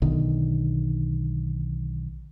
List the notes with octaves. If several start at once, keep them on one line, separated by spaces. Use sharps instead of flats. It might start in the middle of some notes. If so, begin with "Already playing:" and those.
B1 D3 D#3